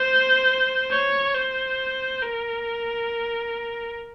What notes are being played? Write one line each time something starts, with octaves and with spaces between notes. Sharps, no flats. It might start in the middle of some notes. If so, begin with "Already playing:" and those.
Already playing: C5
C#5
C5
A#4